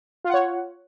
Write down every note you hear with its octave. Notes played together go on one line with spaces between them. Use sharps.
F4 C#5 F#5